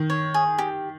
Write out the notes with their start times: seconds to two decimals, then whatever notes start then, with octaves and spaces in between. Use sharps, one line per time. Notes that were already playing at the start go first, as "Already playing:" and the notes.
Already playing: D#3
0.10 C#5
0.34 G#4
0.59 G4